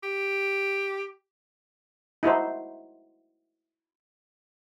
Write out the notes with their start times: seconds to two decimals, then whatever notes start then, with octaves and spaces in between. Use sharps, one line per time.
0.03 G4
2.23 D#4 E4 F#4 C5